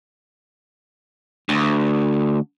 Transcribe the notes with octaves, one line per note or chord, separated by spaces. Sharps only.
D2